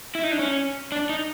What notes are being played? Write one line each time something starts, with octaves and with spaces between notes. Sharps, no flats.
E4
D#4
D4
C#4
D4
D#4